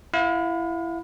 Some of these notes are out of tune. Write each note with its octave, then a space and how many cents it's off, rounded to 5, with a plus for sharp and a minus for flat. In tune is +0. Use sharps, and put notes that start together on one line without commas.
E4 +20 F5 +40